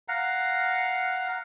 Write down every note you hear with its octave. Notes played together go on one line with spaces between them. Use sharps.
F5 F#5 A#5